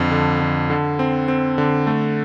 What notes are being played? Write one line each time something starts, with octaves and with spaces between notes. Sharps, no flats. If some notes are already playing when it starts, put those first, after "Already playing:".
Already playing: F2 D3
D3
D3
D3
C4
C4
D3
A3